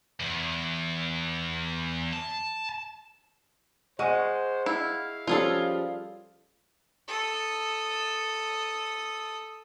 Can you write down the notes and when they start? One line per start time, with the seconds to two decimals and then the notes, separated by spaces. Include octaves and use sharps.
0.20 E2
2.13 A5
3.99 G#3 C5 F#5 C#6 D#7
4.66 E4 F5
5.27 F3 G3 C#4 F4 G#4 A4
7.08 A4 D#6